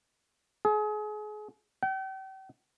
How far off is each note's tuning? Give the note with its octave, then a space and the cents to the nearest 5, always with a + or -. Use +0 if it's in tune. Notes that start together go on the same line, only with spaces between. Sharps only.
G#4 +30
G5 -40